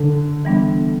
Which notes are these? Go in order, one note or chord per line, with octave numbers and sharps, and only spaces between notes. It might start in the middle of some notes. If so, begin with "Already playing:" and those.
Already playing: D3
E3 G3 B3 D4